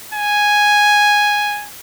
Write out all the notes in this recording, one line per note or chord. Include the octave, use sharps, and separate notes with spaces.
G#5